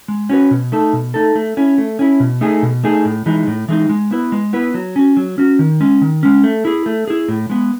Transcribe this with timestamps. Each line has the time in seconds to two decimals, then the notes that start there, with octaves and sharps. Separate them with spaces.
0.08 G#3
0.30 C#4 F#4 B4
0.51 B2
0.72 A3 D#4 A4
0.93 B2
1.14 A3 D#4 A4
1.35 A3
1.57 C#4 E4
1.78 A3
1.99 C#4 E4
2.20 B2
2.41 A3 D#4 G#4
2.63 B2
2.84 A3 D#4 G#4
3.05 A2
3.26 E3 G#3 D#4
3.47 A2
3.68 E3 G#3 D#4
3.89 G#3
4.11 B3 E4 B4
4.32 G#3
4.53 B3 E4 B4
4.74 F#3
4.96 C#4 F#4
5.17 F#3
5.38 C#4 F#4
5.59 D#3
5.81 G#3 C#4
6.01 D#3
6.23 G#3 C#4
6.43 A3
6.65 E4 G#4
6.86 A3
7.07 E4 G#4
7.28 A2
7.50 G#3 B3